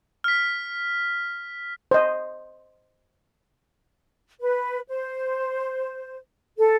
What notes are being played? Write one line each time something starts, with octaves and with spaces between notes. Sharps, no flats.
F6 B6
C5 D#5
B4
C5
A4